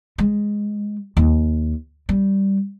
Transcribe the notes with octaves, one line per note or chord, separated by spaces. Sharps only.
G#3
D#2
G3